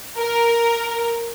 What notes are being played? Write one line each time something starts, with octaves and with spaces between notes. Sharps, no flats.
A#4